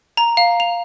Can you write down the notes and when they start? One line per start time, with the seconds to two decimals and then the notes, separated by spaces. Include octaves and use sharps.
0.17 A#5
0.37 F5
0.60 F7